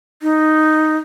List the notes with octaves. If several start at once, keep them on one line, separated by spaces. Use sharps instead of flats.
D#4